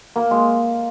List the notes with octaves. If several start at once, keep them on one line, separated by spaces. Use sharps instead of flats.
A#3
G#3